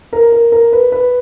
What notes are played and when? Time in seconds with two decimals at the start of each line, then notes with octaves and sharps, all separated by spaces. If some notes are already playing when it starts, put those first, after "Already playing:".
0.13 A#4
0.32 A#4
0.52 A#4
0.73 B4
0.92 B4